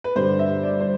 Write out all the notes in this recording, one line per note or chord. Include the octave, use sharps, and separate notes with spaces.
B4
G2 D3 G3 C5
E5
D5
C5